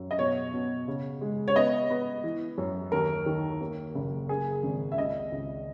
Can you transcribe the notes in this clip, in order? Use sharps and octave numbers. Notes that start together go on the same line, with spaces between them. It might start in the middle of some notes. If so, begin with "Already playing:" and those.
Already playing: F#2
D#5
B2 C#5
B2
C#3
G#3
C#5
B3 D#5
B3
E3
F#2
D#2 A#4
D#3
A#3
F#1
A#3 G#4
G#1
E5
C#2 D#5
C#2